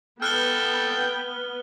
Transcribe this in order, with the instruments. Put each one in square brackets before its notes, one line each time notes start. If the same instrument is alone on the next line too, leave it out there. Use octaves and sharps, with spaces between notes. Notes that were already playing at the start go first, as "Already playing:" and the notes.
[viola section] B3 [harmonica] A4 G5 [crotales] F6 F#6 G7